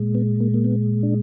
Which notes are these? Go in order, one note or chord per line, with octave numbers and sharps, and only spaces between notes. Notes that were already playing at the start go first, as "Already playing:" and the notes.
Already playing: A#2 G#3
B3
A#3
A#3
B3
D4